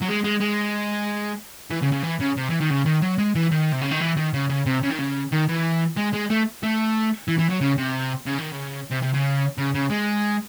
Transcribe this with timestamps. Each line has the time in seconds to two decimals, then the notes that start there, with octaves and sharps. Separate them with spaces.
0.01 F#3
0.07 G#3
0.24 G#3
0.40 G#3
1.71 E3
1.83 C#3
1.93 C#3
2.04 E3
2.21 C#3
2.37 C3
2.50 E3
2.60 D#3
2.70 C#3
2.86 D#3
3.02 F#3
3.18 G#3
3.35 E3
3.52 D#3
3.72 C3
3.81 C#3
3.91 D#3
4.01 E3
4.17 D#3
4.34 C#3
4.50 C#3
4.66 C3
4.83 C#3
4.90 D#3
4.98 C#3
5.32 D#3
5.48 E3
5.96 G#3
6.13 G#3
6.30 A3
6.63 A3
7.28 E3
7.39 E3
7.50 F#3
7.61 C#3
7.77 C3
8.26 C#3
8.38 D#3
8.52 C#3
8.91 C3
9.03 C3
9.14 C#3
9.58 C#3
9.74 C#3
9.90 G#3